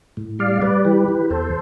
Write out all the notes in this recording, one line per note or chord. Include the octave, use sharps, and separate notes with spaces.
A2
G3 D5 F5
G3 B4 D5
E3 G4 B4
E3
E2 A4 C5